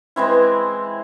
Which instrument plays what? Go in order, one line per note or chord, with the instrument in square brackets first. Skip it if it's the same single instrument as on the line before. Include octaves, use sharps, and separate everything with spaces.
[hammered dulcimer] E3 G#3 C4 E4